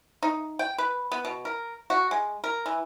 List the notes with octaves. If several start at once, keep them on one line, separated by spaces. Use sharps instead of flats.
D#4
G5
B4
B3
B2
A#4
F#4
G#3
A#4
E3